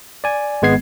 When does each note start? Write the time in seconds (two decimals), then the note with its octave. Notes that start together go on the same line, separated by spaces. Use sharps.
0.24 D5 G#5
0.62 G#1 G#3 B3 G#6 C7